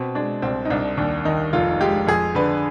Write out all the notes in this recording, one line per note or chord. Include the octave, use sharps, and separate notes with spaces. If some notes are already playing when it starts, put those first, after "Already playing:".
Already playing: B2 C4
G#3 D4
C2 C4
D#4
C2 D4
D#2 D4
D#3 D#4
F1 F4
G#3 G4
F2 G#4
D3 B4